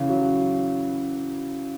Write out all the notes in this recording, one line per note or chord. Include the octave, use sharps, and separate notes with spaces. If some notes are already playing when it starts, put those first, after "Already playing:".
Already playing: C#3 E3
F#3